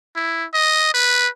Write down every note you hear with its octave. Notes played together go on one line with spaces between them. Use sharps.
E4
D#5
B4